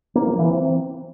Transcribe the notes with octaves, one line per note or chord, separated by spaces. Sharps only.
A#3
F3
E3
C4